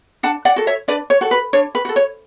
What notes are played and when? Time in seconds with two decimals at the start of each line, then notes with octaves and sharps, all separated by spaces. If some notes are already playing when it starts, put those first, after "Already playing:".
0.23 D4 F#5 A5
0.45 D5 F#5
0.56 F#4 A4
0.67 C#5 E5
0.88 D4 B4 D5
1.10 C#5
1.21 F#4 A4
1.31 B4
1.53 D4 C#5
1.75 B4
1.85 F#4 A4
1.96 C#5